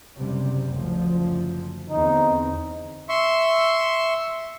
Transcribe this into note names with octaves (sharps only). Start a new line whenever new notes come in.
F#1 C3 G3
F#1 D2 F3
E2 D3 C4 D#4
E5 C6 C#6